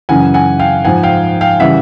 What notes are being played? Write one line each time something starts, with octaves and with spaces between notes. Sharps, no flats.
F#2 C#3 E3 F#5 G#5
F#5 G#5
F5 G5
G#2 F3 F#5 G#5
F5 G5
F5 G5
C#3 E3 G3 E5 F#5